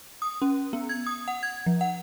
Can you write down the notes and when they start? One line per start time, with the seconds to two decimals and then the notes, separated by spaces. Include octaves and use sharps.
0.22 D#6
0.42 C#4
0.73 B3
0.89 G#6
1.06 D#6
1.28 F#5
1.43 G#6
1.66 F3
1.81 F#5